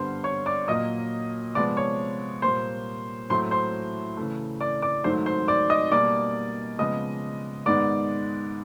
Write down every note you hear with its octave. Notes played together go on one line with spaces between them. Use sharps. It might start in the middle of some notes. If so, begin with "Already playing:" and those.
Already playing: G2 D3 G3 B3 C5 C6
C#5 C#6
D5 D6
A#2 F#3 A#3 D#5 D#6
C3 F3 G#3 B3 D5 D6
C#5 C#6
A#2 G3 A#3 C5 C6
A2 F#3 A3 C5 C6
C5 C6
C#3 E3 A3
D5 D6
D5 D6
G#2 D#3 F#3 A3 C5 C6
C5 C6
D5 D6
D#5 D#6
B2 G3 A#3 D5 D6
C#3 F3 G#3 B3 D#5 D#6
G#2 D#3 G#3 B3 D5 D6